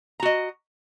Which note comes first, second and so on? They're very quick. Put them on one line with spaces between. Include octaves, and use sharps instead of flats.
A#5 F#4 D#5